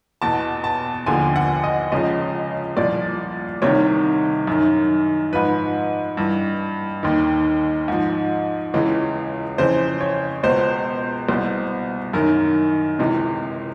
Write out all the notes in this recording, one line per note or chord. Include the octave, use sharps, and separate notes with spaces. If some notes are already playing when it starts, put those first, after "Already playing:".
E2 B2 A5
A5
D#2 D3 F3 G#5
F#5
D#5
C#2 C#3 F3 D#5
C2 A#2 F3 D5
C2 C3 D#3 C#5
F#2 D#3
G#2 F3 B4
G2 E3
D#2 D#3
G#2 F3
C#2 C#3 E3
F2 C#3 E3 C5
C#5
C#2 B2 C5
C2 B2
F#2 D#3 A#4
C#2 C3 E3